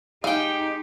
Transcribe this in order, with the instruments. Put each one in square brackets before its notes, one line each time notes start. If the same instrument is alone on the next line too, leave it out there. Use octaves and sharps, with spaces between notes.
[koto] G#3 G5 [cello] D#4 [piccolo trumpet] G4 [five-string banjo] F5